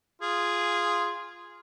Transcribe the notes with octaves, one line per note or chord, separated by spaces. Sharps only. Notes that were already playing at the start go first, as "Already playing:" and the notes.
F4 G#4